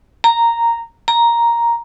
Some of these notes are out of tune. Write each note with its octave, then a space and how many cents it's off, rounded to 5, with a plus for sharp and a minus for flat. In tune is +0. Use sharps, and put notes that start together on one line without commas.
A#5 -5
A#5 +5